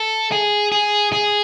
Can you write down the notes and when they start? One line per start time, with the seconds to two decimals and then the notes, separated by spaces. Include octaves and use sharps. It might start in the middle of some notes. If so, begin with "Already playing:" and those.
Already playing: A4
0.32 G#4
0.72 G#4
1.13 G#4